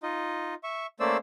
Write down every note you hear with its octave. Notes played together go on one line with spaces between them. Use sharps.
D#4 F4 D#5
E5 C#6
A3 A#3 C#4 C5 D5 E6